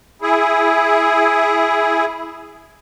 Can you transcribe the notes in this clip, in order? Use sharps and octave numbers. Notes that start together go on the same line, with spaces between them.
E4 G#4